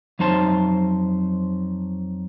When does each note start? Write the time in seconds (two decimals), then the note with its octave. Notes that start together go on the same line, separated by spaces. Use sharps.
0.19 F2 F#3 D#4 C5 A5